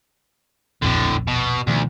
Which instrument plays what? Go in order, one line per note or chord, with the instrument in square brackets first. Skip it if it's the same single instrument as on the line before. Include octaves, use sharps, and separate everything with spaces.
[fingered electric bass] D#1 A#1 F2 [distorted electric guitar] A2 D3
[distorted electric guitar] B2
[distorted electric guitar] D2 [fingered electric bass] B2 D#3 F3